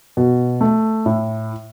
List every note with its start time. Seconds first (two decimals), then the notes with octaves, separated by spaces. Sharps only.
0.17 B2
0.61 A3
1.06 A2